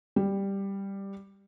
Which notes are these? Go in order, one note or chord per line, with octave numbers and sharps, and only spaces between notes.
G3